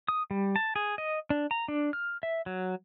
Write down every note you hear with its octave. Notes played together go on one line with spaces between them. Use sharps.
D#6
G3
A5
G#4
D#5
D4
A#5
D4
F6
E5
F#3